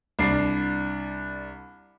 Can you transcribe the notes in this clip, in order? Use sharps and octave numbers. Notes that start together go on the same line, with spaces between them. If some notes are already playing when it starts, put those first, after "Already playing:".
C2 D4 C7